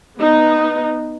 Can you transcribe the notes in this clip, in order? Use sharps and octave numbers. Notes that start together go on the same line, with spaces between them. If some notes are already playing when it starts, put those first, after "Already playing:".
B3 D#4